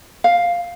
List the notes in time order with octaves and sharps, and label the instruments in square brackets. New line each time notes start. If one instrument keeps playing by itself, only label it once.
[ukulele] F5